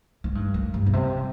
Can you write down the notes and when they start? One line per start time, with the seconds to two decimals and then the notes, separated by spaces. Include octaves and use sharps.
0.24 G#2
0.35 G2
0.54 F#2
0.74 G2
0.86 B2
0.93 C3